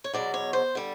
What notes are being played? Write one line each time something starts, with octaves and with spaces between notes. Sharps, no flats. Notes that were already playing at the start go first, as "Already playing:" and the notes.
C#5
E2 B2 F#3 D5
C#5
C5
D3 G3